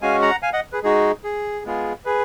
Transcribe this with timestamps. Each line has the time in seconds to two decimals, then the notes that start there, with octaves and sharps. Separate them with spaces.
0.01 G#3 C#4 F#4 F5 G#5
0.22 F#5 A#5
0.43 F5 G#5
0.53 D#5 F#5
0.72 G#4 B4
0.83 G#3 D#4 F#4 G#4
1.24 G#4
1.65 G#3 B3 F4 G#4
2.05 G#4 B4